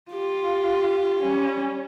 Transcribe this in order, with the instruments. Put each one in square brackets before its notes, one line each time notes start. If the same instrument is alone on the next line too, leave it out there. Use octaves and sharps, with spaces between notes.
[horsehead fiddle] F4 [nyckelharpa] G4
[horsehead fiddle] G3 C#4